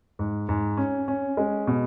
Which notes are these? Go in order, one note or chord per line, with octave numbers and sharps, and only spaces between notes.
G#2
G#2
C#4
C#4
G#3
B2